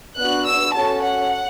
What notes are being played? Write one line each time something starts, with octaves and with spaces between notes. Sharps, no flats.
B3 D4 F#4 F#6
E6
C#4 F#4 A4 A5
F#5